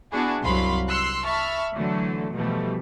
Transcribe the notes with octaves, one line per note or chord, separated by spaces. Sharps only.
B3 D4 E4 F#4 G#4
C2 F#2 F#3 F5 B5 C6
C6 E6 F#6 C7 C#7
E5 A5 B5 C#6 F6
D3 E3 F#3 A3
B2 E3 F3 G3 A3